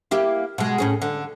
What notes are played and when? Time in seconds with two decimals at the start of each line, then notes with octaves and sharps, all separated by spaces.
0.11 A#3 E4 G4
0.58 B2 G#3
0.78 A2 C#4 G#4
1.02 D3